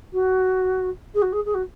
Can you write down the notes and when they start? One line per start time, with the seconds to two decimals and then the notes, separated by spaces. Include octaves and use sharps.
0.13 F#4
1.14 G#4
1.22 F#4
1.32 G#4
1.45 G#4
1.54 F#4